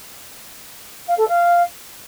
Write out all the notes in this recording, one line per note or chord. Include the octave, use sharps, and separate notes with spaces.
F5
A4
F5